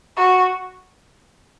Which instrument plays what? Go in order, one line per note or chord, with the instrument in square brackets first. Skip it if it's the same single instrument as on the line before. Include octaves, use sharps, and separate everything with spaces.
[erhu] F#4